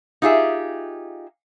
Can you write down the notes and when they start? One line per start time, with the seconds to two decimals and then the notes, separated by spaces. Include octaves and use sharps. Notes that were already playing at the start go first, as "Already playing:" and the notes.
0.22 D#4 F4 G4 G#4 E5